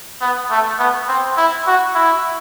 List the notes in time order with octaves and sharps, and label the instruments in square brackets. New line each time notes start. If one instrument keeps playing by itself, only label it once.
[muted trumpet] B3
A3
B3
C4
E4
F#4
E4